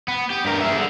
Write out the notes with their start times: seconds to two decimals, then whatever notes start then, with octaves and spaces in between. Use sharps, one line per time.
0.08 B3
0.30 G4
0.45 G2 A#4
0.61 G#4 E5
0.76 D3